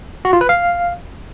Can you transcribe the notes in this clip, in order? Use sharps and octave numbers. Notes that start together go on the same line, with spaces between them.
F#4
F4
B4
F5